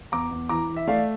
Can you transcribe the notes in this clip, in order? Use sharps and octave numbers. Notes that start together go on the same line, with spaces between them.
E2 A#5 D6
E2
E3 A#5 D6
E3
E5
A3 D5 F5